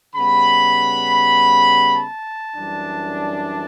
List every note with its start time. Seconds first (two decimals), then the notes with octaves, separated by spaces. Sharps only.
0.16 C#3 G3 B3 B5
1.95 A5
2.55 F#2 E3 G3 D4